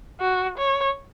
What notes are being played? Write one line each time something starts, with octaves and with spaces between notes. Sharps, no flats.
F#4
C#5